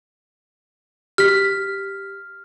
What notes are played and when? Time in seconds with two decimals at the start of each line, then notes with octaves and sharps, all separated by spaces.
1.18 G4 F6 B6